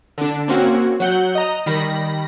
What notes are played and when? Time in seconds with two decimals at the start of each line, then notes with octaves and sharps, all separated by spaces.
0.18 D3 D4
0.48 A#3 C4 C#4 F#4
1.00 F#3 F#5 G6
1.35 D#5 A#5
1.66 D#3 G3 B5 A#6